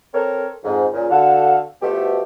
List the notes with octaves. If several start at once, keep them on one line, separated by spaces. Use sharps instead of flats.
C4 A4 A#4 C#5
F2 G#2
A#2 C#3
D3 F#4 A4 F5
B2 F3 A3 G4